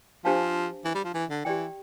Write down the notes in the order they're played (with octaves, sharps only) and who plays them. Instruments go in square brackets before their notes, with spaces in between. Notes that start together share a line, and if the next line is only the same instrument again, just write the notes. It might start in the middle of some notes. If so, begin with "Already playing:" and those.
[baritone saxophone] F3 [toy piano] D4 G4 C5 F5 A5
[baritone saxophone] E3
G3
F3
E3
D3
[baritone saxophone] E3 [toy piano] G4 D5 G5